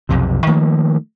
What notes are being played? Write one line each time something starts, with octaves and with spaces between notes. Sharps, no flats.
B1 F2 C3
D#3 F3 A3 A#3